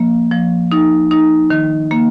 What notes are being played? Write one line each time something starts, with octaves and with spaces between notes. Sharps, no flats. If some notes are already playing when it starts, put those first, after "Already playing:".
Already playing: F3 A#3
F3
D#4
D#4
D#3
A#3